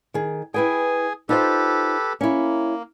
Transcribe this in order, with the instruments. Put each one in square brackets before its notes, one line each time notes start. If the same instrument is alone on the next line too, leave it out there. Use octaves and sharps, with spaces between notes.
[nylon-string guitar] D#3 G#4
[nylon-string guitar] E4 B4 G5 [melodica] G#4 G#5
[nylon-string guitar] D#4 F4 C5 [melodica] G4 A4 B4
[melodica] A#3 [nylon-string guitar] C#4 E4